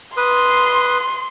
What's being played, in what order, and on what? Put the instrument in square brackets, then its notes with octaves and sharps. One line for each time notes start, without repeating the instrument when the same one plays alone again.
[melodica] B4 D#6 [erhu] C6